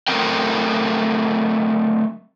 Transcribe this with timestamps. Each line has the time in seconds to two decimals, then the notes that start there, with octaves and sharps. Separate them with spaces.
0.08 F#3 A3 C4 A#4 G5